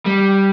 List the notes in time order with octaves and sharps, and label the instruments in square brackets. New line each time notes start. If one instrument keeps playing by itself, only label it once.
[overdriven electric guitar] G3